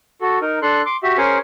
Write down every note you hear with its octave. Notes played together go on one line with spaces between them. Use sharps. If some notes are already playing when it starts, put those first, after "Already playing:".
F#4 A4
D#4 A#4
D4 A4 C6 F#6
C6 D6
F#4 G4 E5
C#4 G#4 A#4 C5 G#5 C#6